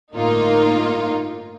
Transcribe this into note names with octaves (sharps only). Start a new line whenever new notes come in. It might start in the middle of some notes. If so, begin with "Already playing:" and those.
G1 A2 A#3 D#4 F4